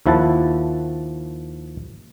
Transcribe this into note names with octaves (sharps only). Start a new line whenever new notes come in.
D#2 F3 E4 F#5 A5